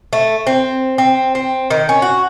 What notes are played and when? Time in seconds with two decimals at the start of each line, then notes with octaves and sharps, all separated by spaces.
0.13 A3
0.47 C4
0.98 C4
1.35 C4
1.70 D#3
1.89 C#4
2.02 F#4